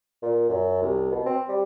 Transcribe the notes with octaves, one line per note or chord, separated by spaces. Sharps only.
A#2
F#2
C2
B2
C4
G3